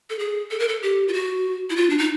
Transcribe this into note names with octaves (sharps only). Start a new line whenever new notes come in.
A4
G#4
A4
A#4
A4
G4
F4
F#4
E4
F4
D4
D#4